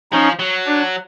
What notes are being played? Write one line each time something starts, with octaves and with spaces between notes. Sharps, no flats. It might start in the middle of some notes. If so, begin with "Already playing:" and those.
F3 C#4 D#4
F#3
D4